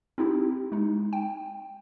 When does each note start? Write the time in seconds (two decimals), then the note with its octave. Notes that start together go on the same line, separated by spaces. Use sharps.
0.18 C4 D#4 E4 G4
0.72 G#3 D#4
1.13 G5